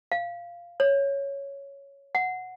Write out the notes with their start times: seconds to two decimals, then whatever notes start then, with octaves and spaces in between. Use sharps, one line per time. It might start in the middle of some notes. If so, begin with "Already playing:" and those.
0.12 F5
0.80 C#5
2.15 F#5